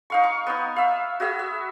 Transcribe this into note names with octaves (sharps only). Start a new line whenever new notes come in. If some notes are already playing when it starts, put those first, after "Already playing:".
D#4 F5 C#6
C#6
B3 D#4
E5 F5
F#4 G#4 E5
E5